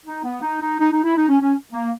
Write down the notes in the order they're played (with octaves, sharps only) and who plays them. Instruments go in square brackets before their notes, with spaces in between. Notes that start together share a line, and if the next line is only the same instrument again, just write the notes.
[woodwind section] D#4
B3
D#4
D#4
D#4
D#4
E4
D#4
C#4
C#4
A#3